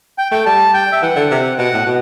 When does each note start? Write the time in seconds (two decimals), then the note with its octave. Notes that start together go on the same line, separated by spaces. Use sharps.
0.18 G5
0.31 A3 G5
0.46 G3 A5
0.74 G5
0.92 E5
1.02 E3 F#5
1.16 D3
1.31 C3
1.58 B2 F#5
1.73 A2
1.86 B2